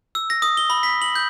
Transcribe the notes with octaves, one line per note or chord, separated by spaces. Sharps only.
E6
A#6
D#6
G7
B5
B6
F#7
G6